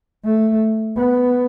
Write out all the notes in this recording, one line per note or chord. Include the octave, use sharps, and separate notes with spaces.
A3
B3